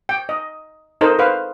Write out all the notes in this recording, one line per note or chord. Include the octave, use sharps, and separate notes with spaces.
G5
D#5
D#4 A4 A#4 C5 D#5
B4 C5 F5